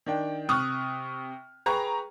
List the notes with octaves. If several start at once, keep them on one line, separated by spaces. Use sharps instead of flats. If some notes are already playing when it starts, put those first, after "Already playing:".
D#3 D4 G5
C3 C#6 D#6 F6 F#6
G#4 B4 G5 A#5 C#6